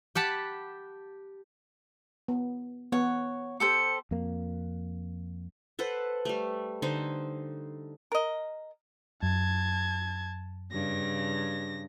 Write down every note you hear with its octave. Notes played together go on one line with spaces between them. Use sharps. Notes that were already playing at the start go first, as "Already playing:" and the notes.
G4 F#5 A5 B5
B3
B3 C#5 F#5
G4 A4 C5 C#7
F2 A#3
A4 B4 C5 F#5
G3 A3
D3 D#4 C5
A#4 D#5
F#2 A5 G#6
G2 C#3 A#6